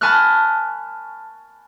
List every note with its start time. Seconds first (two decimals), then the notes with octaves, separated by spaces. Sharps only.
0.01 G#5 A5 B5 C#6 F6 F#6